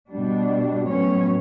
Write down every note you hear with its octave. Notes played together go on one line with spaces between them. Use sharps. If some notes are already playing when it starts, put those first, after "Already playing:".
B2 G3 D4
A2 F#3 B3 C#4 C#5